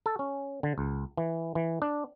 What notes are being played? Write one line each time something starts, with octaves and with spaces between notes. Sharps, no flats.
A4
C#4
D3
C#2
E3
E3
D4